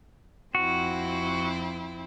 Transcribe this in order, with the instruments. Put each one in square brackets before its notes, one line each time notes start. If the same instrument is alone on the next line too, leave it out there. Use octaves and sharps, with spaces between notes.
[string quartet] F2 C4 E4 [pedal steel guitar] F#4